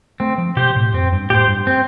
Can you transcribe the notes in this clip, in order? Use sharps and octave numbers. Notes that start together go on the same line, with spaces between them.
A3 C4
F3
B2 G4 C5
A2
F2 C4
G2
A2 G4 C5
G2
C4